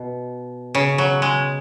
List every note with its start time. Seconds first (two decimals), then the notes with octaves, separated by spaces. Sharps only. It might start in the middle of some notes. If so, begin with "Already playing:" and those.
Already playing: B2
0.75 C#3
0.98 F#3
1.22 G#3